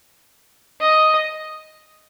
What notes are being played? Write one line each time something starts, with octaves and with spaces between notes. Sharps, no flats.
D#5